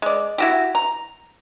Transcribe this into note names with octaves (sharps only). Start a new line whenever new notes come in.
G#3 D5
E4 F#4 G4
A#5